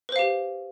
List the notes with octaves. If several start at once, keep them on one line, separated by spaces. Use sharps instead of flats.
G4 B4 C5 F5